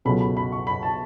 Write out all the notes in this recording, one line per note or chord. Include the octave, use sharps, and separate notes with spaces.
C#2 B2 F#3 A3 B5
B5
B5
C#6
B5
A5